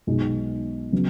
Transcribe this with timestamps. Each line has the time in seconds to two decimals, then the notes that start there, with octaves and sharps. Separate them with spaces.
0.07 B1 B2 G#3 D#4
0.92 C#3 F#3 B3